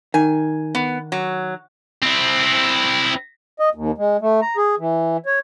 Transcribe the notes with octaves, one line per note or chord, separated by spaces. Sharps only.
D#3 G#5
B3
F#3
C4 E4
D#5
D#2
G#3
A3
A#5
G#4
E3
C#5